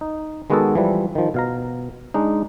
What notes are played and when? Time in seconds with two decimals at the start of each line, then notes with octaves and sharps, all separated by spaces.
0.01 D#4
0.50 D#3 G#3 B3 F#4 G#4 A4
0.75 E3 F3 G3
1.15 D#3 F3
1.34 B2 F5 A#5
2.14 G#3 D4 D#4